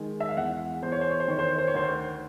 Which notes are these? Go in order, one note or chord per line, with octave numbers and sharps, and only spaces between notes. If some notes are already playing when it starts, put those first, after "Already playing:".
Already playing: D#3 G#3
E5
F5
E2 F#5
E2 C5
C#5
C5
C#5
C5
D#3 C#5
C5
C#5
C5
C#5
D2 C5